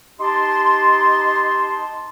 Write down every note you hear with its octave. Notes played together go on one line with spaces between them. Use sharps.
D#4 G4 A5 C6